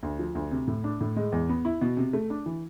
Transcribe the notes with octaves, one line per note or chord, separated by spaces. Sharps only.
D2
F3
D2
C3
A2
D4
A2
G#3
E2
B3
E4
B2
C3
A3
D4
E3